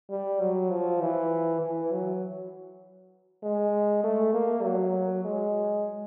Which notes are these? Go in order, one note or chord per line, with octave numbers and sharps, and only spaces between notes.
G3
F#3
F3
E3
E3
F#3
G#3
A3
A#3
F#3
G#3